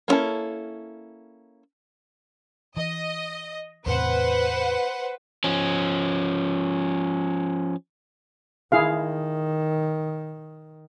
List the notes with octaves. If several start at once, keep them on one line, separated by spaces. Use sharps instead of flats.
A#3 B3 C#4 E4 A4
E3 D#5
E2 A2 C3 B4 C5 F#5
F3 C#4
D#3 E4 G#4 F5